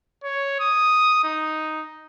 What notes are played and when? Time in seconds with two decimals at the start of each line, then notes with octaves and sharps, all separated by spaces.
0.23 C#5
0.60 D#6
1.24 D#4